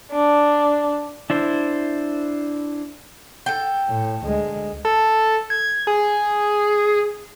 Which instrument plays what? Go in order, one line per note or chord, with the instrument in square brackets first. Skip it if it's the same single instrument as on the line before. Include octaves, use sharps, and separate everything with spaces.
[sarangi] D4
[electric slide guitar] D4 E4 C5
[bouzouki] A4 G5
[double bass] A2
D2 G#3
[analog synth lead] A4
G#6
G#4